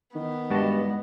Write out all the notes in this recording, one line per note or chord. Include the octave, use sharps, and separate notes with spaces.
D#3 B3
G2 G#3 F#4 D#5 A5